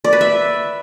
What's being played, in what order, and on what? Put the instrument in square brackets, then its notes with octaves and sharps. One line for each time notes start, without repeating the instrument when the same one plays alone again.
[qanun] D5
B4
E5